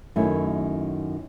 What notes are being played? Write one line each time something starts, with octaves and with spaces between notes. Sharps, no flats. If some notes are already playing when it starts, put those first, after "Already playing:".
F#2 D#3 A3 C#4 E4